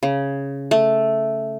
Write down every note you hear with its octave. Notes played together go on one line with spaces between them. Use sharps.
C#3
A3